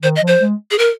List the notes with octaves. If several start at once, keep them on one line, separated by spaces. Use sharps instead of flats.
D#3 C5
D#5
F3
C5
G#3
G#4
A#4